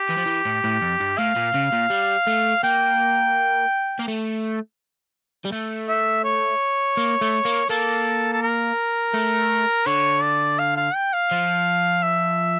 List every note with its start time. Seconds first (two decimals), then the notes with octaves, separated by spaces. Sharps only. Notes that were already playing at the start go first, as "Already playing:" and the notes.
Already playing: G4
0.09 E3
0.17 F3
0.26 E3
0.45 A2
0.64 A2
0.82 F2
1.00 G2
1.18 A2 F5
1.36 A#2
1.54 C#3
1.72 A#2
1.90 G3
2.27 A3
2.63 A#3 G5
3.99 A#3
4.08 A3
5.45 G3
5.52 A3
5.88 E5
6.24 C#5
6.97 A#3
7.21 A3
7.45 A#3
7.69 A#3 A4
8.33 A4
8.42 A#4
9.14 A3
9.86 D3 C#5
10.23 D5
10.59 F5
10.77 F5
10.95 G5
11.13 F5
11.31 F3
12.03 E5